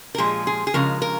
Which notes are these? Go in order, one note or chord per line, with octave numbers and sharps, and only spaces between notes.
A#4
A#2 F3 G#3 G#4
G#4
G#4
C#3 F3 G#3 A#4
A#4